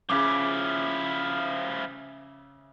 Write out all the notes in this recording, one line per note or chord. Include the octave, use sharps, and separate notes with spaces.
C#3 F3 E4 E5 D6